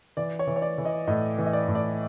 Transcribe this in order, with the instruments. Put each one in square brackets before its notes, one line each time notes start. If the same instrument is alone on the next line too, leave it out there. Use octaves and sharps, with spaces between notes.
[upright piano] E3 D5
C#5
E3
C#5
D5
E3
D#5
A2 D#5
E3
D#5
D5
A2
D5